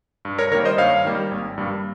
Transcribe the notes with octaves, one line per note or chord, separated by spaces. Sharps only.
G2
A#4 C#5
D#3 G3 A#3 A#4 C#5
C5 D#5
G2 C#5 F5
D#3 G3 A#3
G#1
G2 G3 A#3